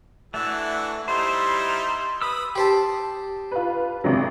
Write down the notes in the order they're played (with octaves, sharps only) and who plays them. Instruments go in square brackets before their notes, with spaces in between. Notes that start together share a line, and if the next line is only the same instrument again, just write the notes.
[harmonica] E3 D4 F#4 [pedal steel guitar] A3
[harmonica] G3 D#4 E4 [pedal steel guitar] C5 [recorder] C6
[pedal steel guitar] B4 E6 [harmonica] B5 D#6
[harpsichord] G4 C5 A5
[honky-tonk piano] F4 B4
G#1 C3 F#3